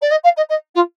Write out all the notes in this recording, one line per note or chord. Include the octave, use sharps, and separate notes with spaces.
D5
D#5
F5
D#5
D#5
F4